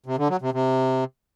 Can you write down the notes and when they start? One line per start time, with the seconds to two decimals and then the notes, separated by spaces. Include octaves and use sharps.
0.06 C3
0.18 D3
0.30 F#3
0.41 C3
0.53 C3